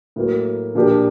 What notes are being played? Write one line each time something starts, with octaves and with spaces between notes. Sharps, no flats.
A2 F#3 A#3
A#2 F3 A#3 D4 G4